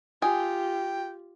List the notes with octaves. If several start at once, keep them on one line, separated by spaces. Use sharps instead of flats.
F4 G4 G#4 G5